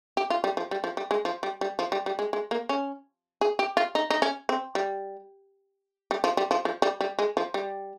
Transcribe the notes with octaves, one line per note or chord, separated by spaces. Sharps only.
G4
F4
G3
F3
G3
F3
G3
G#3
F3
G3
G3
F3
G3
G3
G#3
G#3
A#3
C#4
G#4
G4
F4
D#4
D#4
C#4
C4
G3
G3
F3
G3
F3
F3
G3
G3
G#3
F3
G3